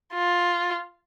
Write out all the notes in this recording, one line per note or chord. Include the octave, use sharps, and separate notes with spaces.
F4